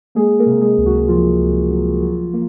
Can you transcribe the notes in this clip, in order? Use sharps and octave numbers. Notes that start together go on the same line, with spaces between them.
G#3 A#3 G#4
A#3 A#4
C3
G#3 G#4
C#2
F#3 F#4
F3 F#3 F4
C#2
F#3
F#3
A#3